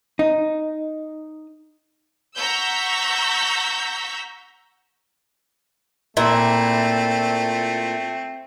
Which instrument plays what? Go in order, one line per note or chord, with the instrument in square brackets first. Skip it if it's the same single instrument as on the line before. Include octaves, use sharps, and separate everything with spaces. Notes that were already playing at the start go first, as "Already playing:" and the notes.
[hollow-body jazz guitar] D#4
[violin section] F#5 A#5 C#6 E6 G6 B6
[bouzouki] A#2 E4 [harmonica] A3 C4